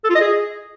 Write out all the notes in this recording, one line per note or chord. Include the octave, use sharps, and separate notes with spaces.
A4
F4
D#5
G#4